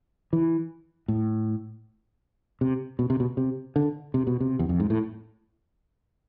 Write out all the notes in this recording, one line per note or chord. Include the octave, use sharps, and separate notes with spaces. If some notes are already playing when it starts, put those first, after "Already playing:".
E3
A2
C3
B2
C3
B2
C3
D3
C3
B2
C3
E2
F2
G#2
A2